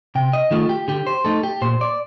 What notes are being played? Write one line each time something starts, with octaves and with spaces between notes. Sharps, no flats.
C3 G5
D#5
D#3 A3 F4
G4
D3 G4
C5
A3 D#4 A4
G4
A#2 C5
D5